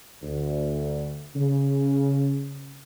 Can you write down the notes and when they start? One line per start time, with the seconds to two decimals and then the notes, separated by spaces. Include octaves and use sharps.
0.23 D2
1.36 C#3